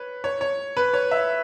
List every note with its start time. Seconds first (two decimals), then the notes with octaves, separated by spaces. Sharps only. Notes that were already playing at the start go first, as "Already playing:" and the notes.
Already playing: B4 C#5
0.24 C#5
0.41 C#5
0.77 B4
0.94 C#5
1.11 E5